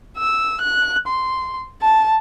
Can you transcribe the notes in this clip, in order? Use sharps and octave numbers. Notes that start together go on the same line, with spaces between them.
E6
F#6
C6
A5